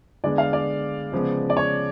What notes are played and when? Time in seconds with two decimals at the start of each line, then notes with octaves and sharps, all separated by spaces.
0.24 D3 G#3 B3 D5
0.38 F5
0.53 D5
1.12 C#3 F3 G#3 B3
1.50 D5
1.57 C#5